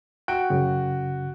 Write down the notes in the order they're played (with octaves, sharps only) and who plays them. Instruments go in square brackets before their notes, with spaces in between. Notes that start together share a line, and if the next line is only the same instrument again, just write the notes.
[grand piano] F#4 G5 D7 [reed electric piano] F#6
[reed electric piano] F#2 C#3